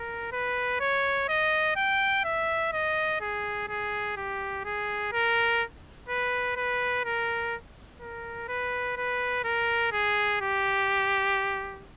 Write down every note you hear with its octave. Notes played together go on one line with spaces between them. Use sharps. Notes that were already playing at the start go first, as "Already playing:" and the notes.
Already playing: A#4
B4
C#5
D#5
G5
E5
D#5
G#4
G#4
G4
G#4
A#4
B4
B4
A#4
A#4
B4
B4
A#4
G#4
G4